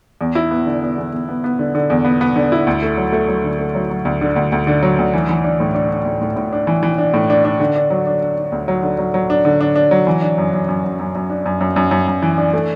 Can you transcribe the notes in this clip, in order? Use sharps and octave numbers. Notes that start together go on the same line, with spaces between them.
E2
E4
B3
D3
B3
E2
E2
B3
B3
D3
D3
E2
B3
B3
D3
E4
D2
A3
F#3
A3
F#3
D3
A3
F#3
F#3
D2
D3
D2
D2
D3
F#3
D2
E3
E3
D4
A2
D4
D4
A2
A2
A2
D4
E3
E3
D4
A2
D4
D4
D3
D4
F#3
D4
D4
D4
D2
F#3
D3
F#3
F#3
D4
D3
D4
D4
F#3
E3
D4
F#2
F#2
F#2
F#2
F#2
F#2
D4
F#2
F#2
F#2
F#2
F#2
E3
D4
A3